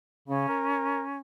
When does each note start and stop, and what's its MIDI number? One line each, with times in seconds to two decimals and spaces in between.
0.28 0.44 49
0.28 1.18 61
0.48 1.02 70